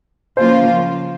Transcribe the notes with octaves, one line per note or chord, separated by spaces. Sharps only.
C#3 F3 A#3 F4 C5